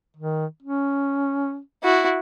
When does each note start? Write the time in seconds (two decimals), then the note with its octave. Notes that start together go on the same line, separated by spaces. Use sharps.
0.17 D#3
0.63 C#4
1.83 E4 F#4